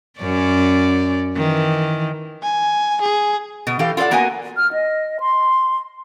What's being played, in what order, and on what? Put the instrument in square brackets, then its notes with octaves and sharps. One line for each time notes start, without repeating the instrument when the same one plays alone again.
[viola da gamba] F#2 C#4 D5
D#3 E3
[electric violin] G#5
G#4
[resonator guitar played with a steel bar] B2 D#5
E3 G4 A4 F5
F4 A4 C5 D5 F#5
A#3 B3 F#4 A#4 D#5 G#5
[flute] F6
D#5
C6